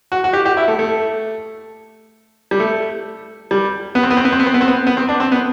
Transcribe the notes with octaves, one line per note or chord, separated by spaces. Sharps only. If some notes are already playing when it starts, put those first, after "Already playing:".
F#4
F#4
G4
G4
E4
A3
A3
G3
A3
G3
B3
C4
B3
C4
B3
C4
B3
C4
B3
C4
B3
B3
C4
D4
C4
B3